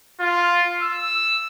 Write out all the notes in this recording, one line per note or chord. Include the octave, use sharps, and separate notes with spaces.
F4
E6